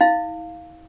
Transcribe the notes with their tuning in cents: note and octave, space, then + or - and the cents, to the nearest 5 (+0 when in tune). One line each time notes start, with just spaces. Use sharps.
E4 -45 F5 +0